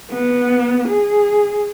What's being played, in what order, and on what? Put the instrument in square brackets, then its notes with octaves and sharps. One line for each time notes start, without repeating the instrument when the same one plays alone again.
[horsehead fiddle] B3
G#4